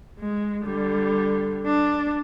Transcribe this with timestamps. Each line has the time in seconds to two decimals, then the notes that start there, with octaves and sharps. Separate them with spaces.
0.19 G#3
0.64 D3 G3
1.66 D4